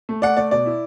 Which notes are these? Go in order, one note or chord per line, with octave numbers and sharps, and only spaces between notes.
A3
A3 D5 F#5
A3 D5
B2 D5
E4